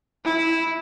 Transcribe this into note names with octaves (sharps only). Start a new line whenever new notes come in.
E4